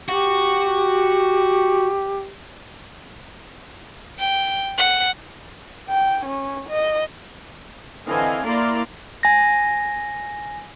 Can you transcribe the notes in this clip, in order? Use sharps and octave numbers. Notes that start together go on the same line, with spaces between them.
F#4 G4
G5
F#5
G5
C#4
D#5
D3 E3 C4 D#5 F5 G#5
A#3 E4 D5 F5 A#5 C6
G#5 A#6